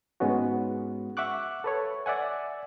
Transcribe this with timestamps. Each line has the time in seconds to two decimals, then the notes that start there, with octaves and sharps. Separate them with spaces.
0.20 G#2 G#3 B3 C#4 F#4
1.17 E5 F#5 C#6 D6 F#6
1.64 A4 B4 C#5
2.06 D5 E5 F#5 G#5